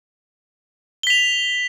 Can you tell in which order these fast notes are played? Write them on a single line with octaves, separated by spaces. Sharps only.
G7 B6 F7